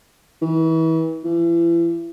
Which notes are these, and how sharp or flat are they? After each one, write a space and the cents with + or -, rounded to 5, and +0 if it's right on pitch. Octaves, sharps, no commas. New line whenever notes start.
E3 -35
E3 +35